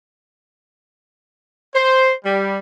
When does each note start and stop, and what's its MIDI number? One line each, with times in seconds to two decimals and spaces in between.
1.73 2.11 72
2.25 2.58 55